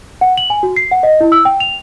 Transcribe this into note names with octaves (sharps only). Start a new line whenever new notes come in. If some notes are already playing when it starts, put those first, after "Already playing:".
F#5
F#7
G#5
F#4
C7
F#5
D#5
E4
E6
G5
F7